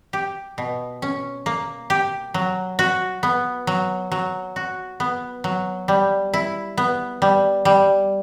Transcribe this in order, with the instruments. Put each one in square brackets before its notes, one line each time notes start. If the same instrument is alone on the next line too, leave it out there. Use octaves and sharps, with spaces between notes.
[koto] G4
B2
C#4
A#3
G4
F#3
F#4
B3
F#3
F#3
F#4
B3
F#3
G3
E4
B3
G3
G3